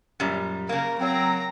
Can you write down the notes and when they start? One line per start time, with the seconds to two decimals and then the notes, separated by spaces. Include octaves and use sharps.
0.20 F#2 A#2 G3
0.69 C#3 A#3 A#4
0.99 F#3 C4 A#4 A#5